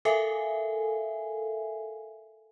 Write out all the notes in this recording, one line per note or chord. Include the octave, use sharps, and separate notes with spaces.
A4 A#4 E5 F5 G#5